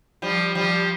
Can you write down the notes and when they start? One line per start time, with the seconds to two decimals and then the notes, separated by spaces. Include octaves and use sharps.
0.22 F3 G3
0.55 F3 G3